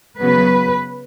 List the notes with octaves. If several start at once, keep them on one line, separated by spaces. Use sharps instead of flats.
C#3 F#3 B3 B4